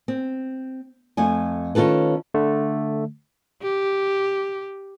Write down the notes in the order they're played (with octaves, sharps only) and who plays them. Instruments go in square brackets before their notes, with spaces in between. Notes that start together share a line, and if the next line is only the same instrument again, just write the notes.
[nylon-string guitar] C4
F2 A3 G#5
D#3 C#4 F4 A4 B4
[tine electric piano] D3 A3
[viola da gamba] G4